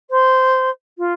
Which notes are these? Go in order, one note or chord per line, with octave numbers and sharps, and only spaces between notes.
C5
F4